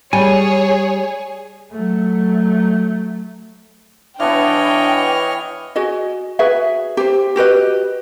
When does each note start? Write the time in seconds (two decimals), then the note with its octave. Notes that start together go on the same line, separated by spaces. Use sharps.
0.13 G3 G#4 C#5 G#5
1.72 F#3 A3
4.20 E3 B3 D4 C#5 D#5 G5 F6
5.76 F#4 G#4 D#5
6.39 F#4 G#4 B4 E5
6.97 G4 C5
7.36 F#4 G4 B4 D#5